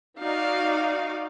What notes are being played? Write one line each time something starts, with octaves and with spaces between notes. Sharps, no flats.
D#4 F#4 D5 F5